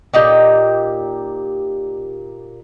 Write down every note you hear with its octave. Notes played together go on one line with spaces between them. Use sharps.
A#2 D#4 G4 G5